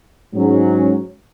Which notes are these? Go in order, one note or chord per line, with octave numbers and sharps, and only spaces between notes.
G#2 F#3 C#4